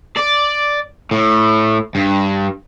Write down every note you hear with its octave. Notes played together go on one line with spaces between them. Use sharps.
D5
A2
G2